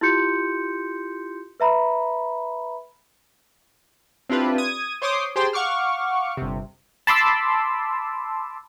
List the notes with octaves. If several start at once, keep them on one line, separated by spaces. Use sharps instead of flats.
E4 F4 G4 C6 G6 C#7
B4 E5 A#5 B5
C4 D4 E4 F4 G4 B4
D#6 G#6 D#7
C5 C#5 C6 D6 D#6
G4 G#4 C5 G5 A5 C6
F5 F#5 C#6 D6 F6
G1 C3
A5 B5 C6 D6 E6